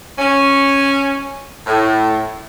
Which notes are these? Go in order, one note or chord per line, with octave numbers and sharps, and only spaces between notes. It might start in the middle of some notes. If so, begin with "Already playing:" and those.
C#4
A2